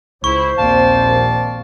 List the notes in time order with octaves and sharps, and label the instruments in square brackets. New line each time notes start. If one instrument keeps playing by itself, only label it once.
[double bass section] C#2 [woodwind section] E4 [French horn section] C5 [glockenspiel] C#6
[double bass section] A#1 D#2 C4 [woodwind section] D5 F5 A5